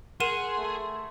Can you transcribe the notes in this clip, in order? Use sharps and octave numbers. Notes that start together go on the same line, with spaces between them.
G#4 A#4 F#5 C6 D#7 E7
A3